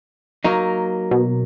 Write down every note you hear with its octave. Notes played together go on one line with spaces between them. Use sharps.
F#3 A#3 D#4
B2